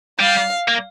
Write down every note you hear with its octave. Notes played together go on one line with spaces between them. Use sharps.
G3 F5
A#3